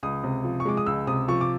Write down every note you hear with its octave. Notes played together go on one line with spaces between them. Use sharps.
C#2 D#6
C3
F3
C#6
G#3 D6
D#6
C#2 E6
C3 D#6
F3 C#6
D6